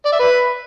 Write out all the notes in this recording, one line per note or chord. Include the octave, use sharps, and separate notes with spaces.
D5
E5
B4